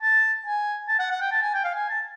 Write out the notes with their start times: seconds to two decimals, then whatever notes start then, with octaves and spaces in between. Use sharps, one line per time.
0.02 A5
0.46 G#5
0.88 A5
0.99 F#5
1.11 F#5
1.21 G5
1.32 A5
1.42 G#5
1.54 G5
1.64 F5
1.75 G#5
1.89 A5